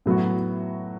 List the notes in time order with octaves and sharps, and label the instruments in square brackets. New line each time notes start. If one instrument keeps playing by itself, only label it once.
[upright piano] A2 F#3 B3 F#4